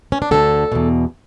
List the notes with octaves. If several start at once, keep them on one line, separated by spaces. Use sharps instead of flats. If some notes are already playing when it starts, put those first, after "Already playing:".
C#4
D4
D2 D3 A4
E2 B2